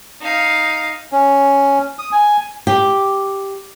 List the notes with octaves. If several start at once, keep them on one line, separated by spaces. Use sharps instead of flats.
D#4 F5
C#4
D#6
G#5
G4